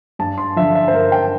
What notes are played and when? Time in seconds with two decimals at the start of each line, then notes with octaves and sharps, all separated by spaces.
0.19 G2 A5
0.38 C6
0.56 D3 F3 E5
0.75 E5
0.88 C5
0.94 G2 A#4
1.12 G5